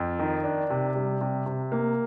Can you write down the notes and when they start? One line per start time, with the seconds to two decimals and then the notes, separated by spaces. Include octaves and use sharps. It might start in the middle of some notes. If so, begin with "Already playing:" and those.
Already playing: F2
0.19 D#3
0.44 D4
0.70 C3
0.96 G3
1.21 C3
1.46 C3
1.72 A#3